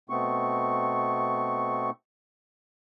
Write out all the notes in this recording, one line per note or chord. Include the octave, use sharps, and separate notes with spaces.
B2 A3 B3 C4 C#6